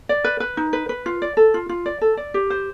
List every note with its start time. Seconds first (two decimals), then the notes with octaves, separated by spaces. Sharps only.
0.09 D5
0.24 B4
0.40 B4
0.57 D#4
0.73 B4
0.89 B4
1.06 F4
1.22 D5
1.37 A4
1.54 F4
1.69 F4
1.86 D5
2.01 A4
2.17 D5
2.34 G4
2.50 C5